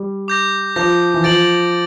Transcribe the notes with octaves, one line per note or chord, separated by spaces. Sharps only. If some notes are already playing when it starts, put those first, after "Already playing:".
Already playing: G3
D6 G6 A#6
F3 D6 G6 A#6
E3
F3 A6 D7 F#7